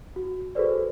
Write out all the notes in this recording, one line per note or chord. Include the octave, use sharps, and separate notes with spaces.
F#4
F#4 G#4 A4 B4 C5 D5